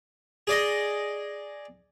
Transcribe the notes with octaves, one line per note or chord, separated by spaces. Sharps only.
G#4 D5 D#5